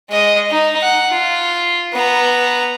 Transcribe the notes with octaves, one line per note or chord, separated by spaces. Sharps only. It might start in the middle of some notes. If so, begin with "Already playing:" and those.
G#3 D#5
D#4
F#5
F4
B3 A#5